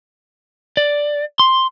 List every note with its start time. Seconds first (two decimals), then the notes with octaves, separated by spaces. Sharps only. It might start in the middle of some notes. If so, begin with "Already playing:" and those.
0.77 D5
1.39 C6